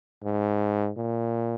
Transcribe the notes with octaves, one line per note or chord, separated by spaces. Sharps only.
G#2
A#2